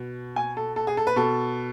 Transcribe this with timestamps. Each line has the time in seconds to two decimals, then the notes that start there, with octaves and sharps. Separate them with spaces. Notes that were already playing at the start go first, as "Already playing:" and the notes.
Already playing: B2
0.36 G#5
0.57 A4
0.76 A4
0.87 G#4
0.97 A4
1.07 B4
1.16 B2 A4